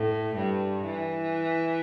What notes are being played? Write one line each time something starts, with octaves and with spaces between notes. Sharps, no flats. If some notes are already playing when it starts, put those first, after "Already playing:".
Already playing: A2
G2
E3